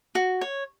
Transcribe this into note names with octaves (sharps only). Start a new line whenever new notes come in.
F#4
C#5